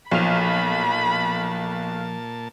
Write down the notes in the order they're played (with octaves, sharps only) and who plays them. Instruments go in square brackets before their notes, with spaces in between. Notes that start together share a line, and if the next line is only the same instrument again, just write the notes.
[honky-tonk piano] B1 [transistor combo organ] A#2 A5 [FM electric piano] F3 F6 [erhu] B5